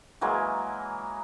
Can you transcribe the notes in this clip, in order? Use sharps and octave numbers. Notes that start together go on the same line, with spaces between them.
E3 F#3 G#3 A#3